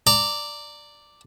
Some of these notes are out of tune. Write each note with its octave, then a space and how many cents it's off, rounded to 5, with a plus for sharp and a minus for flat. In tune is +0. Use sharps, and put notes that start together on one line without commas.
D5 +0 A#5 -25